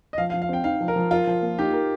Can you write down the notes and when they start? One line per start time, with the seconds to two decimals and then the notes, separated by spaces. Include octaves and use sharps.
0.13 D#5
0.18 F3 F5
0.30 F5
0.34 F3
0.42 F5
0.49 C4 G5
0.64 D#4 F5
0.80 F3
0.88 A#4
0.96 F3
1.11 F4 A#4
1.27 F3
1.42 A#3
1.58 D#4 G4
1.73 A#4